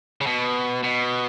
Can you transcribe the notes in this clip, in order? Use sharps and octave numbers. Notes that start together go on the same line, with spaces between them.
C#3
B2
B2